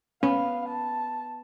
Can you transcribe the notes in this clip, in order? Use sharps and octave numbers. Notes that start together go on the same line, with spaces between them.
B3 C#4 F5
A5